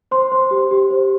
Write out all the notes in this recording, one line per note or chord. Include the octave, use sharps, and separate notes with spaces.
C5 C6
C5
G4
G4
C5